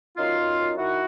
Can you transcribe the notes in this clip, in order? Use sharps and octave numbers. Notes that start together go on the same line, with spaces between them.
F#2 D#4 F4
F#2
F#2
D#3 E4 F#4